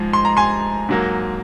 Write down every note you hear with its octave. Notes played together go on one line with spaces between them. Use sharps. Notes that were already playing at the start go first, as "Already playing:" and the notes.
Already playing: G#2 F3 G#3
C6
A#5
G#5 C6
G#2 F#3 A#3